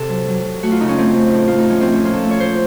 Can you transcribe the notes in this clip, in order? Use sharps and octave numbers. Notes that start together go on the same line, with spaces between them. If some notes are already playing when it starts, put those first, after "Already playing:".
Already playing: C3 A4
F#3
F#3
F#3
A3 F#4
F4
C#3 D#4
C#4
A3 C4
A3
A2
A3 F4
D#4
F3 C#4
C4
A3
C#4
A#2 F4
A4
A3
C#5
A#2 C5